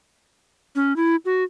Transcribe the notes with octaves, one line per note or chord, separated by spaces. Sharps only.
C#4
E4
F#4